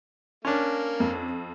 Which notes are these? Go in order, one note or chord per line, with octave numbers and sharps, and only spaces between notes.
A#3 C#4 D4
F2